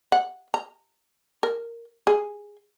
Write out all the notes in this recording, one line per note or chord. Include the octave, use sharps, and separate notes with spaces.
F#5
A#5
A#4
G#4